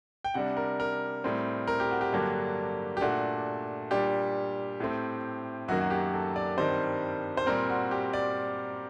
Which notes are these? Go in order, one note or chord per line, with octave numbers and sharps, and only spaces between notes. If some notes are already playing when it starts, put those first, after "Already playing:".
G5
C3 G3 D4 F#5
A#4
A#4
A2 G3 C4
A#4
G4
F#4
G4
G2 D3 F#3 A#3 D4
G4
A#2 A3 D4 F#4
A#2 G3 D4 G4
A2 A3 C4
F#2 D#3 F#3 A#3 F#4
F#4
G4
A4
D5
G2 D#3 G3 C4 C5
C5
A#2 G3 C4 A#4
F#4
G4
D5